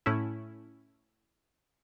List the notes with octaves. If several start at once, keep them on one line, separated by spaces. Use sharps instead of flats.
A2 A3 C#4 E4